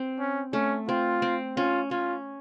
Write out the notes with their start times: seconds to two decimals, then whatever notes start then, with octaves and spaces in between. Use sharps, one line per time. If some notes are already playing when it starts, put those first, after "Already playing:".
Already playing: C4
0.19 C#4
0.53 A3 C#4
0.88 C4 F4
1.22 C4
1.57 C#4 F4
1.91 C#4 F4